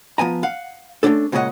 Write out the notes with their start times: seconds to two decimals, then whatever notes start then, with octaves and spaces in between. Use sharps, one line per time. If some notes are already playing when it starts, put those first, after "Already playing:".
0.18 F3 B3 G#5 A#5
0.43 F5 F#5
1.03 A3 A#3 C#4 D4 A4
1.32 A#2 C#3 G#3 C#4 D#5 F#5